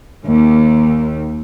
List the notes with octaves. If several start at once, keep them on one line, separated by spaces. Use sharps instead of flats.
D#2